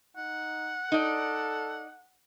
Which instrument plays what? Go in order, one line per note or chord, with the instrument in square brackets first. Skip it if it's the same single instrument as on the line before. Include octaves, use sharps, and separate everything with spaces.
[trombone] D#4 [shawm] F#5
[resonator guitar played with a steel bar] D#4 D5 [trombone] A4